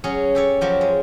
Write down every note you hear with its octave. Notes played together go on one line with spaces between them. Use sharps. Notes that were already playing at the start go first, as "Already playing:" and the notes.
F#3 C#4 G#4 C#5
G4 A4 C#5
F3 F#3 G4
G#3